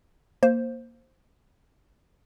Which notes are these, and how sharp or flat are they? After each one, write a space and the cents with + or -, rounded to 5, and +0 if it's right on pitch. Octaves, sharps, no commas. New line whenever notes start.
A#3 +0 C5 +5